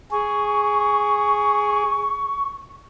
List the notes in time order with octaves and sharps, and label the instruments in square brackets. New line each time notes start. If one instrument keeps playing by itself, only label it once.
[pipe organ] G#4 [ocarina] C#6